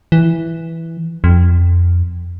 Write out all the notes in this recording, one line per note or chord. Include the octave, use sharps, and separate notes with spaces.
E3
F2